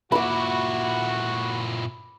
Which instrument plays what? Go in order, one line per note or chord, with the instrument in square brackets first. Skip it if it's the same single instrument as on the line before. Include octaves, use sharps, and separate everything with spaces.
[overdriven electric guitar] A#2 E4 [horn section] F#4 [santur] B5 D6